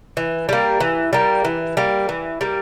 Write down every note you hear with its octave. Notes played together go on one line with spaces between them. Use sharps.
E3
G3 A#3
E3
G3 A#3
E3
G3 A#3
E3
G3 A#3